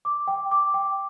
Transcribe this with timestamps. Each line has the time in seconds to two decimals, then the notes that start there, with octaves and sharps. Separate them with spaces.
0.05 D6
0.28 G5
0.51 D6
0.74 G5